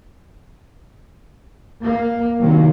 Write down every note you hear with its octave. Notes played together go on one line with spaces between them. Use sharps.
A#3
C2 C3 D#3 F#3 A#3